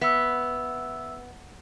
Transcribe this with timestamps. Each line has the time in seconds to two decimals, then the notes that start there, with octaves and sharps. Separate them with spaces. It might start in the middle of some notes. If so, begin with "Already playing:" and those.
0.01 B3 E5 E6